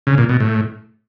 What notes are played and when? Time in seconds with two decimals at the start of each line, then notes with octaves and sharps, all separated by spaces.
0.07 C#3
0.18 A#2
0.29 B2
0.40 A2